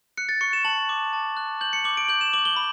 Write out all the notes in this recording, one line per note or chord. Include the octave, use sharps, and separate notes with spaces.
F#6 C#7
A6
C#6 C#7
E7
A5 F#7
D6
A5
F#6
G6 F#7
C#7
D6 F#7
D7
G6 F#7
E7
D6 F#7
G7
B5